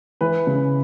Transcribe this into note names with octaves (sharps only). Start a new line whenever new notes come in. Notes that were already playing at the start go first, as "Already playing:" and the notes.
E3 B4
C#3